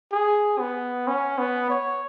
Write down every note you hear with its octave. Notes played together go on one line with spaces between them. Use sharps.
G#4
B3
C#4
B3
C#5